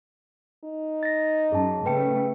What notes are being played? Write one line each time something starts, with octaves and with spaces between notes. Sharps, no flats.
D#4
A6 A#6
F#2 G#4 A5
C#3 A3 B4 G5 C#7